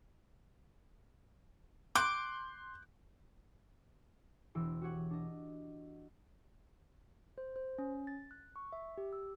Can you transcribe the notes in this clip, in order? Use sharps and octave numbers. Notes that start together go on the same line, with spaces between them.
C6 D6 F#6 G6
E1 E3 C5 E6 D7
F#4 G4 C#5 F#5
D4 D#5
C5
C5
C#4
A6
F#6
C#6
E5
G4
E6